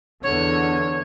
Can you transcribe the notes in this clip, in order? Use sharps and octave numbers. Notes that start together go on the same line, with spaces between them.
E2 D3 C#5